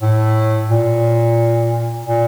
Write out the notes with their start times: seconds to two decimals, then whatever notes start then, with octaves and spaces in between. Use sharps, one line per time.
0.02 A2
0.70 A#2
2.06 A#2